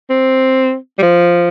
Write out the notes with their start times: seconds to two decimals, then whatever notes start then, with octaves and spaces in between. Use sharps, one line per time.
0.10 C4
0.98 G3
1.02 F3